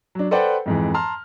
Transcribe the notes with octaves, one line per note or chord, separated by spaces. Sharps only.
F#3 D4
A4 B4 C5 D5 F#5 G5
F2 G#2 E3
A5 A#5 C6 F6